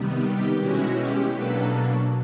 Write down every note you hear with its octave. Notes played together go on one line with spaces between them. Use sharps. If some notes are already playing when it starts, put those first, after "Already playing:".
Already playing: C3 D#3 G3 B3
G4
B2 G#3 C#4 E4 F#4
G4
B2 F#3 A#3 D4 A4 B4